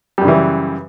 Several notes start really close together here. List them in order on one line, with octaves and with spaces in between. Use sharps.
G3 F#2 C#3 E3